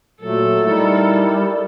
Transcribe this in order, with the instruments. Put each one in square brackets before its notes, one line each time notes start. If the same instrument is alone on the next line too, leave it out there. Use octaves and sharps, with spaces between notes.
[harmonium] A#2 F#3 [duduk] A3 [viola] A4
[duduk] G3 [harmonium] D#4 E4 A#4